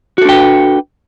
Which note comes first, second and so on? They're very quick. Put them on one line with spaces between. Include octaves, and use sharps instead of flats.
F#4 A4 D4 G5 B4